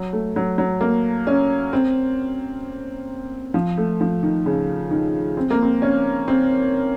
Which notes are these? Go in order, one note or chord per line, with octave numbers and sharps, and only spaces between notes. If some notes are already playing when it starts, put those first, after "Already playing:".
Already playing: F#3
A3
F#3
F#3
A#3
C#4
C4
F3
A3
F3
D#3
C#3
D#3
C4
A#3
C4
C#4
C4